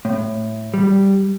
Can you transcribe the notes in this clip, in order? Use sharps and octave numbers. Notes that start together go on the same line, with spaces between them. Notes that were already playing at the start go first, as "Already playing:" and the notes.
A2
G3